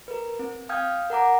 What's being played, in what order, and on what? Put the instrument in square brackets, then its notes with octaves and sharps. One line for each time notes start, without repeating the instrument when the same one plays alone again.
[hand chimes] A#4 B4
C4
F5 G5 D#6 F6 G6 G#6
A#4 F#5 A#5 D6